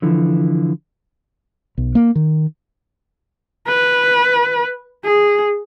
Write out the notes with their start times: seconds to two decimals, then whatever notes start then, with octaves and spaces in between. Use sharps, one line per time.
0.02 D3 E3 F3
1.78 B1
1.95 A#3
2.15 D#3
3.67 B4
5.05 G#4